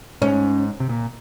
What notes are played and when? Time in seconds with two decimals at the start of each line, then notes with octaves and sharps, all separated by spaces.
0.21 G#2 C#4
0.80 C3
0.89 A#2